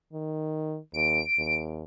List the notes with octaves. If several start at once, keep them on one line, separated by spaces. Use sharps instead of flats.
D#3
D#2 D7
D#2